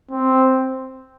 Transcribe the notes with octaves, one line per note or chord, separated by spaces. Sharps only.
C4